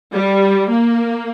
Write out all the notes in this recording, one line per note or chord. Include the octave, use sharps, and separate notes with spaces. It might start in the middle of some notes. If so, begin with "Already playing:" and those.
G3
A#3